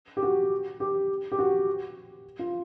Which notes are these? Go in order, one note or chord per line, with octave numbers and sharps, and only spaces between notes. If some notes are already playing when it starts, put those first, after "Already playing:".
G4
F#4
G4
G4
F#4
F4